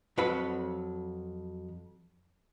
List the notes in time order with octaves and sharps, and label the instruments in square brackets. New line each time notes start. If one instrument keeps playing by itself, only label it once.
[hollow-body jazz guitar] F2 F#3 B4 F#5 B5